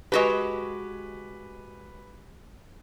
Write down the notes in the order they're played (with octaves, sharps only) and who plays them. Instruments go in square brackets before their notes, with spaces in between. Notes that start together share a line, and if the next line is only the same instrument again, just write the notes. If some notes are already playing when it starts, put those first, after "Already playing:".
[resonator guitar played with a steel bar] G#3 F#4 G4 [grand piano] B4